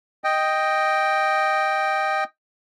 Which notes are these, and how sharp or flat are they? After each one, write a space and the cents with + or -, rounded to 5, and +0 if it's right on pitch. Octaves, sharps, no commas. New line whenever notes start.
D#5 +0 G5 +0